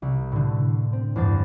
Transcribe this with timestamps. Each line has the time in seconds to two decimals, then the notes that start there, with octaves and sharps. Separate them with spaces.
0.02 C2
0.32 A2 D3
0.93 C4
1.16 E2 G2 C5 A6